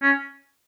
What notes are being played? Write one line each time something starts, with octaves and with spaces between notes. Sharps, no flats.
C#4